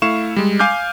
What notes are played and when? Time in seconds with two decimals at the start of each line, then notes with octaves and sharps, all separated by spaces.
0.02 A3 E4 F5 C#6 E7
0.36 G3 G#3
0.59 F5 G#5 D6 F6 G6